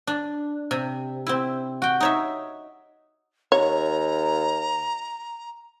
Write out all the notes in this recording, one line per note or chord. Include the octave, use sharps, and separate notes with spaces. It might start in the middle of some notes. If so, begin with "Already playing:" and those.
D4
C3
C4 E4
F#4 G5
D#4 C#5 E5
D#2 C#5 A#5